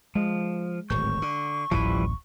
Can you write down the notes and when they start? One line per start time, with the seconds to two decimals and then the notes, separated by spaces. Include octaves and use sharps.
0.15 F3 G#3
0.90 D1 G#1 C#6 G6
1.22 D3
1.71 D1 A1 E3 F3 G3 B4